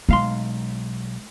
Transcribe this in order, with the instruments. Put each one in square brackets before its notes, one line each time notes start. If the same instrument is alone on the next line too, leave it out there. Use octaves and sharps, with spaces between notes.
[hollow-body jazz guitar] B1 F5 C6 [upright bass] G#3